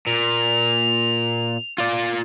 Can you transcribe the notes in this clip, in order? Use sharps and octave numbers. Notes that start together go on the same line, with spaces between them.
A#2 F7
F4 D5